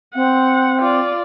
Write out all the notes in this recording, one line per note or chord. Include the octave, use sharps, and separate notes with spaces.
C4 F#5
F4 D5